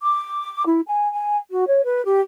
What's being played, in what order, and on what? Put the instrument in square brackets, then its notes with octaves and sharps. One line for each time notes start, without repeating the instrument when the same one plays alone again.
[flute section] D6
E4
G#5
G#5
F#4
C#5
B4
G4